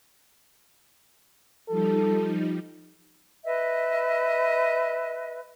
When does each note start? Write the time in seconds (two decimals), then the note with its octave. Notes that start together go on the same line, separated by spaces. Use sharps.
1.69 F3 G3 D#4 A4
3.45 B4 D#5 E5